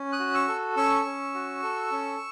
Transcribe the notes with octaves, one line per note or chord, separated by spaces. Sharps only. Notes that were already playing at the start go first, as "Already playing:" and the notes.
Already playing: C#4
D#6 F#6
F#4
C#6 E6
A4
C#4 C#6 E6
C#4
F#4
A4
C#4